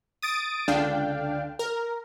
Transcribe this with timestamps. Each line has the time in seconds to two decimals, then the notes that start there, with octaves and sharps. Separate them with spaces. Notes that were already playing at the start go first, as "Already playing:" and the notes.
0.22 D#6 A6 D7
0.68 C#2 D3 D4 F5 G5
1.59 A#4